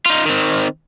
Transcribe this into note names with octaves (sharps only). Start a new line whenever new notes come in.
D#4 F4
D#3 C4